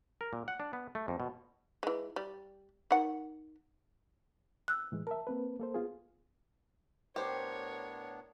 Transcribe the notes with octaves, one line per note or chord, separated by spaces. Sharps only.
A#4
A#2
F#5
D4
B3
A3
F2
B2
E3 G#3
G3
D#3 F#5
E6 F#6
A2 E3 G#3
A#4 E5 A5
A#3 C4 B4
A#3 A4 C5
B3 F4 G#4
A2 B3 D4 G4 A#4 C5 C#5